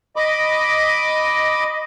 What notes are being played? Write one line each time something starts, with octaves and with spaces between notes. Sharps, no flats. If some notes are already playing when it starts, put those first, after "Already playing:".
D#5 B5 D6